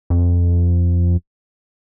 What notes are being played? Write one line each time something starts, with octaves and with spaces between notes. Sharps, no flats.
F2